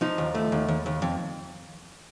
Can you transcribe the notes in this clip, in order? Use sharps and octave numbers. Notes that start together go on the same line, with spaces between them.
F3 D#4
D#2
A3
D#2
D#2
D#2
F2